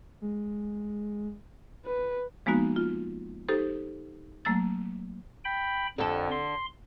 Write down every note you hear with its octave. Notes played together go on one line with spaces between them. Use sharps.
G#3
B4
F3 G#3 A#3 B3 D#4 F#4
F4
D#4 G4 A4 C5
F#3 A3 A#3 E6 A6
G5 B5
F2 D3 A4
C6